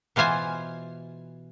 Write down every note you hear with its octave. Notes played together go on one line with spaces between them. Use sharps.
B2 E3 F4 C5 G#5